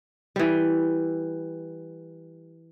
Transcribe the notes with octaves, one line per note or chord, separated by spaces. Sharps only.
E3 G3